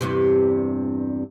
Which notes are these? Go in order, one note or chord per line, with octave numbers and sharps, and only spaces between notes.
E2 G2 C3